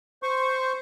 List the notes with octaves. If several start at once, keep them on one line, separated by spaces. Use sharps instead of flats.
C5 C#6